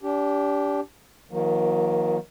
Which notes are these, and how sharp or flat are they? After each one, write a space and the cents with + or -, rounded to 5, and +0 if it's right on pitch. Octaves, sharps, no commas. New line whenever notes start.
D4 -30 G4 +0
D#3 +35 F#3 -40 A#3 +10